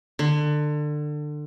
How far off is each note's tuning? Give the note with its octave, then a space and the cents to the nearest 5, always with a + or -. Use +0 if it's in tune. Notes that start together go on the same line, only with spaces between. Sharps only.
D3 +25